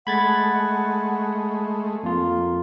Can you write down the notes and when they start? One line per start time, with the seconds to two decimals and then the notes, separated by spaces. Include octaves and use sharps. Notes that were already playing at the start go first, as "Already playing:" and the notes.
0.07 G#3 A3 F#5 B5 G#6 A6
2.03 F2 A#3 F4